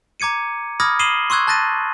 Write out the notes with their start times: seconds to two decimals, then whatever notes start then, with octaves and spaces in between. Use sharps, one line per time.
0.20 A#5 D6 G#6 C#7 D#7
0.80 B5 D6 D#6 F6 G#6 A#6
0.99 D#6 C7 D#7 E7 F#7 G7
1.30 C6 C#6 E6 F#6 G#6
1.48 A5 F#6 A6 A#6 D#7